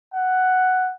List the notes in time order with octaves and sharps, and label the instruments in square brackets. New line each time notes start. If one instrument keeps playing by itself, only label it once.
[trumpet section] F#5